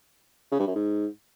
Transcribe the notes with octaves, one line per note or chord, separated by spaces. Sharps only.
C#3
G2
F#2
G#2